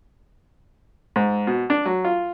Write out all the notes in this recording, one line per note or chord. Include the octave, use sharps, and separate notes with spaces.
G#2
B2
D4
F#3
F4